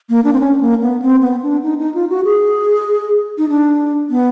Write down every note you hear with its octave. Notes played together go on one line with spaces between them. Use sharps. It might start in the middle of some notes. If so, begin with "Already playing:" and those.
A#3
D4
C4
C#4
A#3
B3
C4
B3
D4
D#4
D#4
F4
F#4
G#4
D#4
D4
B3